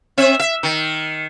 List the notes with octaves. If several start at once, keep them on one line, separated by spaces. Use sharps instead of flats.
C4 E5
E5
D#3